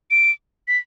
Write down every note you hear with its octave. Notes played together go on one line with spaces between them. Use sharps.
D7
B6